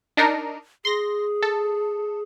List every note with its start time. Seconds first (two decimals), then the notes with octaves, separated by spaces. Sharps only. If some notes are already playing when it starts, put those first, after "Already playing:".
0.17 D4 D#4 A#4
0.85 G#4 C6 A#6
1.42 A4